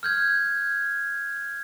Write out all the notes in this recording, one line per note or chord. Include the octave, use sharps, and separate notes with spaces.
F6 G6 G#6